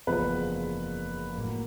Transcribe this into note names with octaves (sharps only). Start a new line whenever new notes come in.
F#1 E2 C#3 F3 B4
A1 A2 F#3 A#3